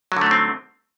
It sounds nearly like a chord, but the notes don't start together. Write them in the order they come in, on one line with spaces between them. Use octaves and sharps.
F#3 D3 A3 D#4 C4